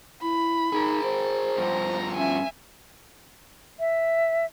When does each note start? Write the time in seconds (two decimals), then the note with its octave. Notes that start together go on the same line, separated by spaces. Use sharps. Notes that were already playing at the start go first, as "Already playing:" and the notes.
0.22 E4 B5
0.73 D#4 G#4 A#4
1.03 C5
1.58 G2 F3 A#5
2.17 C#4 E5 G#5
3.80 E5